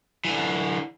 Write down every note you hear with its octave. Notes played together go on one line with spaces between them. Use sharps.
D3 E3